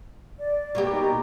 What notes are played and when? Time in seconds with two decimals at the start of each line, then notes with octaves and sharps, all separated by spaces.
0.38 D5
0.75 B2 A#3 G4
0.91 D#4 A#5